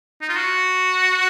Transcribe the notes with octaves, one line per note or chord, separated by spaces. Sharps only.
D#4
F4
F#4